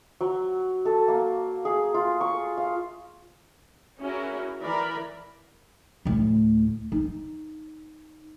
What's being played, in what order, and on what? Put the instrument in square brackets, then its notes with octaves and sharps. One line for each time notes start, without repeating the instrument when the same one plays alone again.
[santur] F#3
A4
A#3
G#4
F4
C#6
F5
[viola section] C#4 E4 F#4 G#4 A#4
E3 A#4 D5 B5
[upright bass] D2 A2
D#4